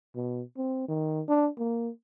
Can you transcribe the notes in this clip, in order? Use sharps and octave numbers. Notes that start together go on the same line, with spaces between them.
B2
C4
D#3
D4
A#3